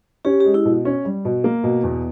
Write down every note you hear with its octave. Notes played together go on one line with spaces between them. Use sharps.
C#4 G4
G#3 G4
E4
B2
C#4
G3
B2
A#3
B2
E2